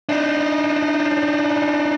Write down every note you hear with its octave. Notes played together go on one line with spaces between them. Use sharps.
D4 D#4